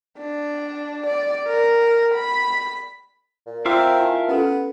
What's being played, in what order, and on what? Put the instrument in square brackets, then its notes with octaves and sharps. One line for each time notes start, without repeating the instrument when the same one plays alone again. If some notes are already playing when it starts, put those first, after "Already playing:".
[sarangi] D4
D5
A#4
B5
[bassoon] A#2
[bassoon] C4 [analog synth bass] F4 [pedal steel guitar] A#4 E5 F5 [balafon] D6
[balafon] E4 G#5 A5
[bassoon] B3 [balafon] C#4 G4 A4